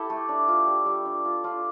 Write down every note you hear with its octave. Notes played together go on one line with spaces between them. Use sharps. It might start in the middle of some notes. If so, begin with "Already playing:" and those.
Already playing: E4 G4 A4
A3
D4
F4
G3
G3
D4
F4
D4 F4